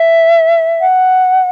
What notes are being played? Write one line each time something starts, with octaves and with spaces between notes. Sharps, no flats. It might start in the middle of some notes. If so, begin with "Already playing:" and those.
Already playing: E5
F#5